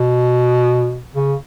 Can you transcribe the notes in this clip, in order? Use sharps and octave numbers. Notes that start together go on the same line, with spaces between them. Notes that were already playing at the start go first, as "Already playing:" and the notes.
Already playing: B2
C#3